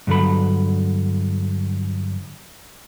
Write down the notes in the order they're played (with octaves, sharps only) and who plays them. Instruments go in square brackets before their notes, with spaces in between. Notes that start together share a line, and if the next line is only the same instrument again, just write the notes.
[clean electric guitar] G2 D3 F#3 A4 B5